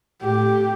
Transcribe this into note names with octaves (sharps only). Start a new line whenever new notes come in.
A2 G4